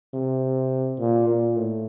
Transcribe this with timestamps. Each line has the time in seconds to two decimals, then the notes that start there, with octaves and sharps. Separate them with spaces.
0.14 C3
0.99 A#2
1.28 A#2
1.56 A2